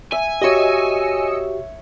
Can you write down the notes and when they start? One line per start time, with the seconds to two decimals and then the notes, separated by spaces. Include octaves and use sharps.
0.12 E5 G#5
0.42 F#4 G4 C#5 D#5 E5 E6 C#7